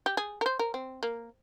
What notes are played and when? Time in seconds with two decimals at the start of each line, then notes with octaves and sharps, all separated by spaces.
0.06 G4
0.17 G#4
0.41 A#4
0.46 C5
0.59 A#4
0.74 C4
1.03 A#3